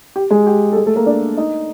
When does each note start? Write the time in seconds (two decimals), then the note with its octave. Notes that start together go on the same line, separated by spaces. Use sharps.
0.16 G4
0.30 G#3 G#4
0.47 G4
0.72 A4
0.76 G#3 G#4
0.86 A3 A4
0.96 A#3 A#4
1.06 D4 D5
1.37 D#4 D#5